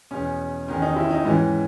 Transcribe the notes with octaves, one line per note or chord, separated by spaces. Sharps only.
E2 B2 C#4
E2 D#3 C#4
D#4
E4
D#4
G#2 E3 C#4